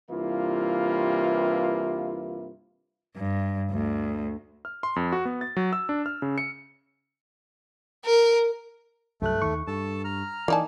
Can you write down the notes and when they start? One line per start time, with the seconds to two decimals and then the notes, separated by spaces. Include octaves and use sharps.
0.10 G2 C3 E3 A#3 E4 F4
3.16 G2
3.71 D2
4.65 F6
4.83 C6
4.96 F2
5.12 F#4
5.25 B3
5.41 A6
5.57 F#3
5.73 E6
5.89 D4
6.06 F6
6.22 C#3
6.38 C#7
8.05 A#4
9.22 C2 G2 F#3 A3 F#6
9.42 D#2 D#3 C#6
9.67 G2 A4 A5
10.04 A#5 F6
10.48 E3 A#3 D#4 D5 G#5 A5